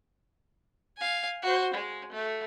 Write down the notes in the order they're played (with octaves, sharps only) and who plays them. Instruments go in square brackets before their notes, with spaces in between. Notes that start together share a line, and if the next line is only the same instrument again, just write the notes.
[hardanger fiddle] F5 G#5
F#4 C5
G#3
A3